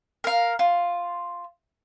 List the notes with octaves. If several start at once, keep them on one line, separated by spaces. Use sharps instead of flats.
A#4 F5
F4